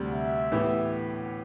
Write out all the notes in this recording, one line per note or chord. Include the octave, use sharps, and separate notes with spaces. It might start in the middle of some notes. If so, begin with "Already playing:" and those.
Already playing: D2 C3 G3
E5
A2 E3 B3 E4 G4